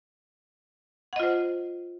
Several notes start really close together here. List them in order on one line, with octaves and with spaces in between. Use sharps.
F#5 D#5 F4 C5